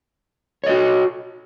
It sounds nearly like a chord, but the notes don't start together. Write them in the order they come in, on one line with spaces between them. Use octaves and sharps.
C#5 D#5 F#4